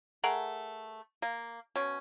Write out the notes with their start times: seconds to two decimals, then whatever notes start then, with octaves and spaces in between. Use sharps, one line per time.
0.24 A3 G#4 A#4 F#5
1.22 A#3
1.76 B2 C#4